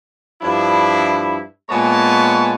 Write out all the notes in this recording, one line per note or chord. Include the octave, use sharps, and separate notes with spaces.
G2 F3 D4 E4
A#2 G#3 B3 C#5 G#5 A5